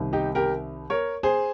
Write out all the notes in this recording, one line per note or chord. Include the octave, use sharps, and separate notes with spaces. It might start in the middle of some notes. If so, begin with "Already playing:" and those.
Already playing: C2 C3 D#3
D#4 G4
G4 A#4
A#4 C#5
G#4 C5